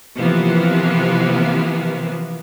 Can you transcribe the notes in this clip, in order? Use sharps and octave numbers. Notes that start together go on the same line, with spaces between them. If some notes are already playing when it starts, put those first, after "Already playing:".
C3 E3 F3 A#3 B3